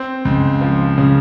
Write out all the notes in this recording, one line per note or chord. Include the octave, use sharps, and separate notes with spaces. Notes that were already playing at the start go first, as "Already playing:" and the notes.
Already playing: C4
C#2
F3
C#3